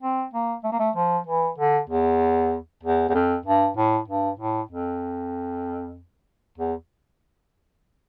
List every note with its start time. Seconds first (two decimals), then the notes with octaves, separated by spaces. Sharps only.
0.02 C4
0.33 A#3
0.64 A3
0.72 A#3
0.79 A3
0.96 F3
1.27 E3
1.58 D3
1.89 E2
2.83 E2
3.09 E2
3.14 F2
3.45 G2
3.77 A2
4.08 G2
4.39 A2
4.70 F2
6.58 E2